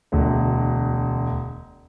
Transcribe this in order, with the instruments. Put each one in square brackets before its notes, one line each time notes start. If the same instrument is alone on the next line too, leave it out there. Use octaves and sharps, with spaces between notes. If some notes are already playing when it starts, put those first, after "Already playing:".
[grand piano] E1 D2